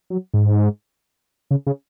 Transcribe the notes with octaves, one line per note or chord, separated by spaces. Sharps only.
F#3
G#2
C#3
C#3